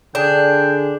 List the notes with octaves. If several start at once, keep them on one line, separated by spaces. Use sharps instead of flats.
D3 D4 G#4 G5